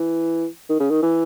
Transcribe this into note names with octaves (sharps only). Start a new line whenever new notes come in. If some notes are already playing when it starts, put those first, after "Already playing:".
Already playing: E3
D#3
C#3
D#3
E3